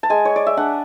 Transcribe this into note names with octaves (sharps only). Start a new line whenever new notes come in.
A5
G#3 G#5
C#5
D5
E5
D4 F#5